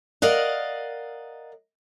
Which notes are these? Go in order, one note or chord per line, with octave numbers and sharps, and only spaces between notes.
A#4 D5 D#5 F5 F#5